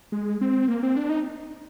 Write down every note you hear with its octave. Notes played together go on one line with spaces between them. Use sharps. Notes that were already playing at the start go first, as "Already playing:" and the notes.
G#3
C4
A#3
C4
D4
D#4